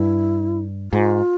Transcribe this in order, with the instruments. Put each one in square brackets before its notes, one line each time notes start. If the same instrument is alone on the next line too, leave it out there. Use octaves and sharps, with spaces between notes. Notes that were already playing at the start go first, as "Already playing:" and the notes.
Already playing: [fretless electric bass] G2 [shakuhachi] E4
[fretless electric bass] G#2 [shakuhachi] F4